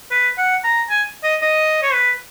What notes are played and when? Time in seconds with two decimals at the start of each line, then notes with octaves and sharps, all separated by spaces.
0.11 B4
0.38 F#5
0.64 A#5
0.90 G#5
1.24 D#5
1.42 D#5
1.83 C#5
1.93 B4